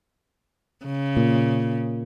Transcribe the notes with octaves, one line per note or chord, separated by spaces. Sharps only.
C#3
A#2